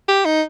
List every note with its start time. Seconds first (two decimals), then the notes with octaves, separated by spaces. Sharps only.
0.08 G4
0.25 D#4